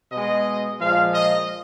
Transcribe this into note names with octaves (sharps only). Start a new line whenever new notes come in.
B2 G#3 D#5
A#2 F3 G#3 F5
D#5